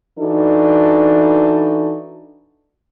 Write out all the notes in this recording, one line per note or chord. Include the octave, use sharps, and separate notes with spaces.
E3 D4 D#4 F#4 A4